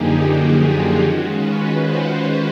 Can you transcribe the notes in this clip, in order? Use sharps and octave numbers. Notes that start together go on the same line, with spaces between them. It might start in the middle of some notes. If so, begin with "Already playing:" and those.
Already playing: F#2 D3 F3 A#3 D#4 G4 G#4
F#4
F4
D#3 G#3 C#4 F4 F#4
B4
C5